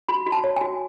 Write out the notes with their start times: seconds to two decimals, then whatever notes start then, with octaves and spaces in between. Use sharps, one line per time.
0.09 F#4 B5
0.26 F#4
0.32 A5
0.44 C#5
0.56 F#4 G#5